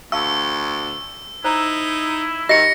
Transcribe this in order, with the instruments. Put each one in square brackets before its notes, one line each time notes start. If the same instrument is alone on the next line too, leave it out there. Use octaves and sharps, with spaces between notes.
[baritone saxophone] D2 [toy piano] F5 A5 C#6 [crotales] E6
[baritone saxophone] D#4 [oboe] E4 [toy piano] C5 A#5
[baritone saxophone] D#3 [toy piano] G4 D#5 [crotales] A#6 C#7